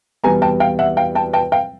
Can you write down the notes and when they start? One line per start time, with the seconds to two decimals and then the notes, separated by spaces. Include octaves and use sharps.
0.23 E2 B2 G3 B3 G#5 A#5
0.42 G5 A5
0.60 F5 G5
0.79 E5 F#5
0.97 F5 G5
1.15 G5 A5
1.33 G5 A5
1.52 F5 G5